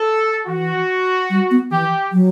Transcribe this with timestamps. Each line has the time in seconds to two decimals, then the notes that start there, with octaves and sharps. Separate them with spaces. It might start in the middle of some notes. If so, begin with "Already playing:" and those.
Already playing: A4
0.47 E3 F#4
1.30 G3
1.51 B3
1.71 E3 G4
2.12 F#3